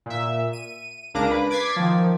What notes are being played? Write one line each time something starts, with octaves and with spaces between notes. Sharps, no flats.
A#2 E5
D#7
C#2 A#3 D4 D6 A#6 D7
B4
D6 G#6 A6 B6 C7
D#3 F3